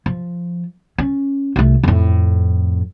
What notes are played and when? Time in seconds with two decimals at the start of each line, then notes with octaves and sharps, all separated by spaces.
0.06 F3
0.98 C#4
1.56 C2 A3
1.83 F2 A2